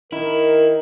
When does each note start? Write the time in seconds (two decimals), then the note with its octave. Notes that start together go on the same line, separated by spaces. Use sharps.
0.13 D#3 E4 A#4